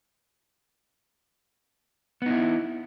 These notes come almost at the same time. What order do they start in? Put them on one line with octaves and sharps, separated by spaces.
B3 D#4 E4